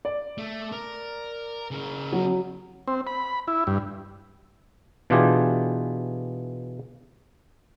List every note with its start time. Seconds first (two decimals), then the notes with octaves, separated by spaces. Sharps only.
0.05 D5
0.38 A3
0.72 A#4
1.71 C#3 A#4
2.13 F#3
2.88 C4
3.07 B5
3.47 E4
3.67 G2
5.10 B2 E3 D4 F4 G4 G#4